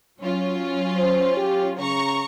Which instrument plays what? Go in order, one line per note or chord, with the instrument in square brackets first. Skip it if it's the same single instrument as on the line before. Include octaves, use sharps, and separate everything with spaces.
[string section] F#3 C#4 F4
[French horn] C5
G4
[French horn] C#3 [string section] A#5 C#6